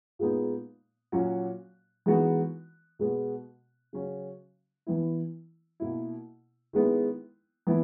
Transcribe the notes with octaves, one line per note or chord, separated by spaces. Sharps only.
A#2 G#3 B3 D#4
A#2 F#3 C#4 F#4
E3 G#3 B3 D#4 F#4
B2 G#3 B3 F#4
C#3 F#3 C#4 F#4
E3 B3 E4
B2 A#3 E4
D#3 G#3 B3 E4
E3 B3 E4